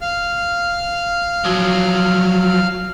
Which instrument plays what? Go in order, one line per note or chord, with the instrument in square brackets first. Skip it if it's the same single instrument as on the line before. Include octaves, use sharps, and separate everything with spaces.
[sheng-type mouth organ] F5 F6
[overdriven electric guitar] F3 F#3